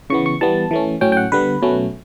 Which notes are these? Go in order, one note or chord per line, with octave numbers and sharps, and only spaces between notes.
C#3 E3 B3 C#6
C#6
E3 G3 B3 A5
E3 A3 C#4
A2 F#3 C#4 G5
G5
F#5
D3 G3 B3 B4
B2 F#3 A3 C#4